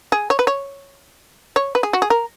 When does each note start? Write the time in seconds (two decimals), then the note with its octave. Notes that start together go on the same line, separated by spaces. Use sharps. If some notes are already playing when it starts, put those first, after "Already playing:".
0.12 G#4
0.30 C#5
0.39 B4
0.47 C#5
1.56 C#5
1.75 B4
1.83 G#4
1.93 F#4
2.02 G#4
2.10 A#4